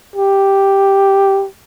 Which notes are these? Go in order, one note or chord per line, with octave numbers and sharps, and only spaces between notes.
G4